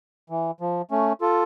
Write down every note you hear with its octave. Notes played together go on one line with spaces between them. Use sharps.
E3
F3
A3 C#4
F4 A4